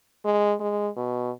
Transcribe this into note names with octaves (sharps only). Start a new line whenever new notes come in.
G#3
G#3
B2